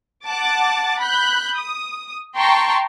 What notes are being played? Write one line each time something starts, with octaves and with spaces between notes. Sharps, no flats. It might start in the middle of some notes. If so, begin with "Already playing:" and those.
F#5 A5 D6 A6
B5 F#6 G6
D#6
G5 A5 A#5 C6 C#6